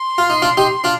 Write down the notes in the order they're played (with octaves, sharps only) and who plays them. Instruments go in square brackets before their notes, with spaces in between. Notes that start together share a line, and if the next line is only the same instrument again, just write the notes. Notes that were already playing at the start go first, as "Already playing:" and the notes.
Already playing: [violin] C6
[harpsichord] F4
D#4
D4 F4
D#4 G4
D4 F4